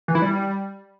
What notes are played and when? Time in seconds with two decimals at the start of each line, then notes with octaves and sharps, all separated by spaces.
0.08 E3
0.15 E4
0.22 G3